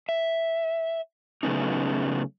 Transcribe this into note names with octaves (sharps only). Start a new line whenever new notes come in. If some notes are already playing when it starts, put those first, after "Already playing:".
E5
C#3 F#3 A3 B3 C#4 D#4